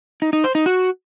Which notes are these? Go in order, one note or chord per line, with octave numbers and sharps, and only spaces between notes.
D#4
D#4
C5
D#4
F#4